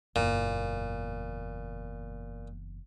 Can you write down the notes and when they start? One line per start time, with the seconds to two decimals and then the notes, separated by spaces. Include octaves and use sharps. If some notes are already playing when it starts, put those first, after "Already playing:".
0.16 F#1 E2 A#2